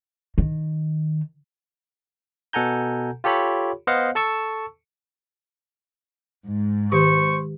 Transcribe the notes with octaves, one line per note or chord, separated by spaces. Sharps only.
D#3
B2 A4 F#5 G#5 A#5 G6
F4 G4 A4 C#5 B5
B3 C5 D#5 F5 F#5
A4 A5 C#6 E6
G#2
D#3 G4 C5 C#6